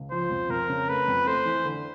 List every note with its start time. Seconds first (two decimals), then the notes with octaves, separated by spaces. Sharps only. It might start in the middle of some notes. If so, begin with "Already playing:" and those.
Already playing: C#2
0.11 F3 C5
0.30 F2
0.49 F2 A#4
0.69 C#3
0.89 A3 B4
1.08 F2
1.27 A3 C5
1.45 E3
1.65 D3